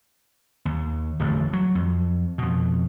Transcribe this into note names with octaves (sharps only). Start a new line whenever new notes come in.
D#2
D1 A1 F2
F#3
F2
F2 B2